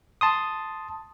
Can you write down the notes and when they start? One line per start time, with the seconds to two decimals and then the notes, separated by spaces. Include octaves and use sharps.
0.21 A5 C6 D#6